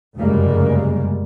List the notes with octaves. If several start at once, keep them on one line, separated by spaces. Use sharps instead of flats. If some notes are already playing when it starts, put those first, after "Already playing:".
F1 F#2 C#3 G3 G#3 A#3